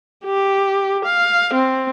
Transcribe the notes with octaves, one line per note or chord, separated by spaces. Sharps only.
G4
F5
C4